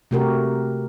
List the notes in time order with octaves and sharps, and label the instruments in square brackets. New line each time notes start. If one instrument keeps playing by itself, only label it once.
[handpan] C3 A3 F#4 G4 A#4